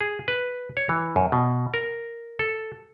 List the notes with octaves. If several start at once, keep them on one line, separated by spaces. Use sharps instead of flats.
G#4
B4
C#5
E3
F#2
B2
A#4
A4